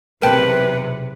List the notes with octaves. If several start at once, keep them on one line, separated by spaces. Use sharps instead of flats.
B1 E2 C3 A#4 B4 G5 A5